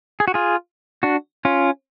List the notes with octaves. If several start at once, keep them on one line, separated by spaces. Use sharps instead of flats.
G#4
F#4
F4 G#4
D4 F#4
C#4 F4